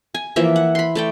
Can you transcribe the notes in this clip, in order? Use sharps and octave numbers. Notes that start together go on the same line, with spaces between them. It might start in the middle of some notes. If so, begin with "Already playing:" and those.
G#5
E3 F3 A#3 E5
F#5
B5 C6
A3 D5 G5